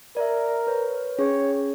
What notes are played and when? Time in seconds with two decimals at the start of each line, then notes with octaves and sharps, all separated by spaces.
0.17 A#4 D5 E5
0.67 B4 C#5
1.18 C#4 G#4 C#5